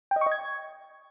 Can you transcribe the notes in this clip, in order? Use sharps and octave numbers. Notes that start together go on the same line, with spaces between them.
G5
D#5
C#6
D#5
G#6